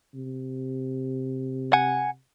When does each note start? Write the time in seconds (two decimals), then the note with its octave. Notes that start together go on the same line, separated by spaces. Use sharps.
0.14 C3
1.73 F#5 G#5